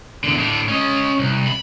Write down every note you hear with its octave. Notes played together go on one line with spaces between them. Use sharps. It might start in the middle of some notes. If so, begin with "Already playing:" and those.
E2 D3
A2 D4
C#4 D#5
C2
B5